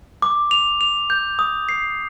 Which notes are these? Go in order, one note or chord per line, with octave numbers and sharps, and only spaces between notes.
D6
F7
F7
G6
D#6
C7